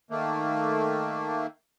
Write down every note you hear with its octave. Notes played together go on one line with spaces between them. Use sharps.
D#3 A3 A#3